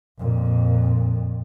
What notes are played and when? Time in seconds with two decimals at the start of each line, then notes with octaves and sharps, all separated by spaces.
0.19 F2 A#2